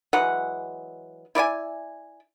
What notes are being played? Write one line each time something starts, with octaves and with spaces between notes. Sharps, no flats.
E3 F#3 G#3 F#5
E4 D5 E5 G#5